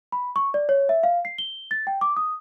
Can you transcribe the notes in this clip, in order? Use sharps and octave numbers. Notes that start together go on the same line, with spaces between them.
B5
C#6
D5
C#5
E5
F5
C7
G7
A6
G5
D6
D#6